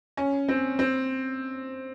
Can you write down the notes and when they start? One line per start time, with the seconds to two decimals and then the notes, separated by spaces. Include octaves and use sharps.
0.17 C#4
0.48 C4
0.79 C4